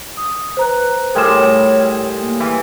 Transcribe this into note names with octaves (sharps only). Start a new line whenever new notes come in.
D#6
B4 C5 A#5 F#6
A2 G3 G#4 A#4 C#5 C6 E7
A#3
E3